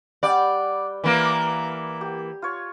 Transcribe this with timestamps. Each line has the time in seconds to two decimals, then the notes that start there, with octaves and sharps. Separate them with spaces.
0.23 G3 D5 F#5 G5
1.04 E3 A#3
2.01 G4
2.42 F4 C#5